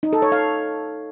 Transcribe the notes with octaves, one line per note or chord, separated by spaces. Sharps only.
D#4
A4
C#5
F5